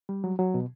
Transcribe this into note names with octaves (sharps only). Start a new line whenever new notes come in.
G3
F#3
F#3
B2